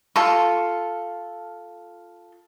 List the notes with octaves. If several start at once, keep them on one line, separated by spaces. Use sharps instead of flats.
F4 A4 C#6